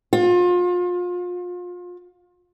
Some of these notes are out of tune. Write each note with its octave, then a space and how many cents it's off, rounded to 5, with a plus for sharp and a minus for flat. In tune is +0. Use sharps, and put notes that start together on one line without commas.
F4 +30